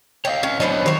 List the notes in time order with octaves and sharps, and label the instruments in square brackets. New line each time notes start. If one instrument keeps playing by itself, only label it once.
[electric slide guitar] C#5 D#5 F5 [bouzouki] G5
[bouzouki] C#4
[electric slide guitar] F#3 D4 C#5 [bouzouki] B3 C5 D#5
[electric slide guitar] D#3 F#3 [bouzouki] C5 C#5